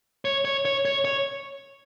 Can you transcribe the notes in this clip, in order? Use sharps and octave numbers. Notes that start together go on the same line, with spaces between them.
C#5
C#5
C#5
C#5
C#5